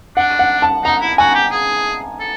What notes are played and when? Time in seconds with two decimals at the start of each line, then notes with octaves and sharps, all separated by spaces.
0.17 D4 F#5
0.39 F#5
0.62 A5
0.84 D#4 A#5
1.01 E4
1.18 F#4 G#5
1.35 G4
1.52 G#4
2.20 A4